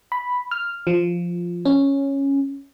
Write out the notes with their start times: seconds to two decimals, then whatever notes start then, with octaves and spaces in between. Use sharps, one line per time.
0.12 B5
0.51 F6
0.87 F3
1.65 C#4